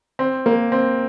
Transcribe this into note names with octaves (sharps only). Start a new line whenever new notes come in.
C4
A#3
C4